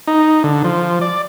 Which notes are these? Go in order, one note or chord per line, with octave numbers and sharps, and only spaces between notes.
D#4
D3
F3
D5